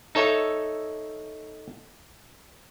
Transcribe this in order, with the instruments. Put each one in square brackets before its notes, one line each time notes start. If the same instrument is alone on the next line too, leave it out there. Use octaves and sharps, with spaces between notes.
[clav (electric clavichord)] D#4 A4 C#5 E5